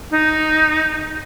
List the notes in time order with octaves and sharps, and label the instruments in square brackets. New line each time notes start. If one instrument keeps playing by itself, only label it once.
[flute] D#4